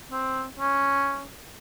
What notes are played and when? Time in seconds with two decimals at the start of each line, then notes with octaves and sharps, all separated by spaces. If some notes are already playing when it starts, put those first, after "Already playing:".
0.12 C4
0.59 C#4